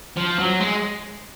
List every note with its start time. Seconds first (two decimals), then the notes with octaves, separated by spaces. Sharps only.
0.17 F3
0.39 F#3
0.60 G#3